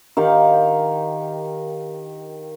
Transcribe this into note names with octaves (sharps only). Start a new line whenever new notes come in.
D#3 G4 F5 F#5